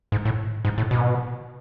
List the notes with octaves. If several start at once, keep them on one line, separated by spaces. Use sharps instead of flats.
G#2
A2
G#2
A2
B2